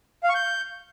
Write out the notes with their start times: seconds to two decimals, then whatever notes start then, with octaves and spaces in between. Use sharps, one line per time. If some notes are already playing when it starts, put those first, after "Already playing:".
0.23 F5
0.29 C#6
0.35 G6